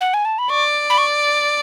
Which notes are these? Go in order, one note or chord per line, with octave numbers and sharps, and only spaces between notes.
F#5
G#5
A5
B5
D5 C#6
B5
C#6